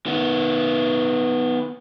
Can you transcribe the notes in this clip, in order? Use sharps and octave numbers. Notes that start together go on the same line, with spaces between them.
D#3 B3